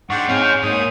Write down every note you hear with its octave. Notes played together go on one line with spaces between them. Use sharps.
G#2 D4 F#5 G5 C#6
C4 D#4 G#4 C#5 F5 G5
G#5 C#6 G6
G#2 A#3 C#5 G#5 D#6